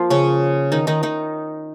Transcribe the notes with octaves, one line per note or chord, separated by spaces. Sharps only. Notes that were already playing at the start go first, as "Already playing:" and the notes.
Already playing: F3 A#3 F4 A#4
C#3 C#4
D#3 D#4
D#3 D#4
D#3 D#4